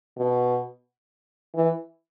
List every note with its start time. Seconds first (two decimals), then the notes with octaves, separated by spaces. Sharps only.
0.18 B2
1.55 E3